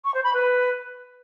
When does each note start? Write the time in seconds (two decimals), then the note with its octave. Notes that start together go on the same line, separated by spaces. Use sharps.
0.04 C#6
0.14 C5
0.24 B5
0.33 B4